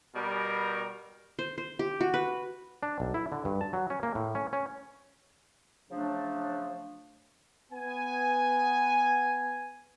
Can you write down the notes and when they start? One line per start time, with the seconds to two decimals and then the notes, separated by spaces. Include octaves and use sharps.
0.16 B2 G3 A#4
1.39 C5
1.58 C5
1.79 G4
2.01 F#4
2.14 B4
2.83 D4
3.00 B1
3.14 E4
3.32 D3
3.45 G2
3.61 A5
3.73 F#3
3.90 C#4
4.03 A#3
4.15 A2
4.35 C#4
4.53 C#4
5.90 C#3 F3 F#3 A3 D4
7.72 B3 G#5